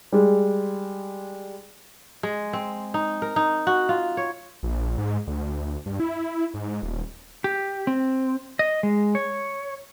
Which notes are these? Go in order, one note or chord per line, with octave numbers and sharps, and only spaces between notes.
G3 G#3
G#3
C4
D#4
A#4
D#4
F#4
F4
C#5
A#1
G#2
D2
G2
E4
G#2
D#1
G4
C4
D#5
G#3
C#5